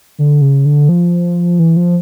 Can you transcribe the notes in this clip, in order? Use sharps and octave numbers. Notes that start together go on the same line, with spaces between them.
D3
C#3
D3
F3
E3
F3